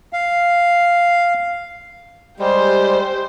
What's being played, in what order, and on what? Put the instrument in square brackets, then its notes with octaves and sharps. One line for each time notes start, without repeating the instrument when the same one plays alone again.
[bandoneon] F5
[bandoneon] G3 G#3 [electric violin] G4 C5